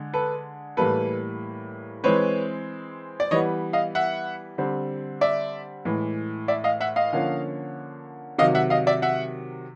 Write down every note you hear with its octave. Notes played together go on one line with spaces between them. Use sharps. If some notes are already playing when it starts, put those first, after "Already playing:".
Already playing: D3 G#3
A4 B4
A2 E3 G3 A#3 A4 B4
E3 G#3 C4 B4 C#5
D5
E3 G3 B3 C#5 D#5
D#5 F5
E5 F#5
D3 G3 C4
D5 E5
A2 E3 G#3
D5 E5
D#5 F5
E5 F#5
D#5 F5
D3 F3 A#3 C#4
C3 D#3 F#3 D#5 F5
E5 F#5
D#5 F5
D5 E5
E5 F#5